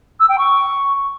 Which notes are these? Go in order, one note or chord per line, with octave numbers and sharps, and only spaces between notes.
E6
G5
C#6